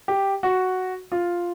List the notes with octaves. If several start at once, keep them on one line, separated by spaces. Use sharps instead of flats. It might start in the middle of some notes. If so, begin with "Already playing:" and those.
G4
F#4
F4